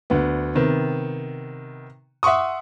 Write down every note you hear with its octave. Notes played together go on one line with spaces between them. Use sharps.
D2 B3
C3 D#3 B3
E5 F#5 C6 C#6 D#6